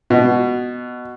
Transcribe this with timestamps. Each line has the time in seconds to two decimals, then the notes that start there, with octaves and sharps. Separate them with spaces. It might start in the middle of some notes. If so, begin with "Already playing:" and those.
0.10 B2